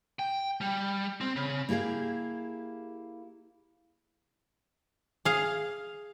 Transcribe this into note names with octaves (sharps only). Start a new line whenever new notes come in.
G5
G3
C4
C#3
A#3 E4 G4 G#4 F5
G#4 F5